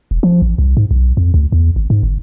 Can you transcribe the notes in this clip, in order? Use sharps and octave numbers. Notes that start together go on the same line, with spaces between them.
E1
F3
A1
C2
G#2
B1
F2
D2
E2
G#1
G#2
G1